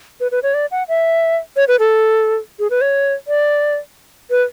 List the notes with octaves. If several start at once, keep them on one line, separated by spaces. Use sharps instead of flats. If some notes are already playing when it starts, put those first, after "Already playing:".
B4
B4
C#5
D5
F#5
E5
C#5
B4
A4
G#4
B4
C#5
D5
B4